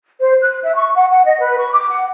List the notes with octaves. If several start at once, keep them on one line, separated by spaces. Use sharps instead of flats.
C5
F#6
E5
C#6
F#5
F#5
D#5
B4
C#6
D6
F#5